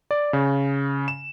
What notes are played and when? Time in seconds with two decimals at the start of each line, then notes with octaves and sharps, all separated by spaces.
0.11 D5
0.33 C#3
1.08 E7